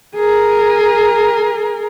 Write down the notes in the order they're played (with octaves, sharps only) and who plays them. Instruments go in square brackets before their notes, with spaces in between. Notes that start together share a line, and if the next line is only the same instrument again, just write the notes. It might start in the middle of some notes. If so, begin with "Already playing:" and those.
[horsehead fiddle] G#4 A#4